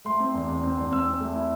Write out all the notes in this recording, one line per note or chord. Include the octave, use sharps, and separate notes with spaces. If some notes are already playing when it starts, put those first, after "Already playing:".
A3 C6
C4
E2
E2
C4
E2
C4 E6
C4
A3
E4